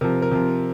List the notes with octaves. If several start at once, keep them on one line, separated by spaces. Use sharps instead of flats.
C3 F3 A#4
A#4
C3 F3